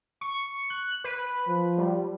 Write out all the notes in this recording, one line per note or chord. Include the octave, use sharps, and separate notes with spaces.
C#6
F#6
B4
F3
G3